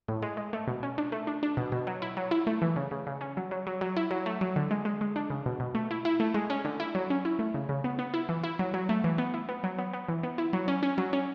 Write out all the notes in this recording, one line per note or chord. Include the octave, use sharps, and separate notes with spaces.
A2
G#3
G#3
A3
B2
C#4
D4
A3
D4
D4
B2
B2
F#3
E4
F#3
E4
A3
E3
C#3
C#3
C#3
C#4
F#3
F#3
F#3
F#3
E4
F#3
A3
F#3
D3
G#3
G#3
G#3
D4
C#3
B2
B2
A3
E4
E4
A3
G#3
C#4
D3
E4
F#3
C#4
E4
A3
C#3
C#3
B3
B3
E4
E3
E4
F#3
F#3
A3
E3
B3
E4
B3
F#3
B3
B3
E3
B3
E4
F#3
C#4
C#4
F#3
C#4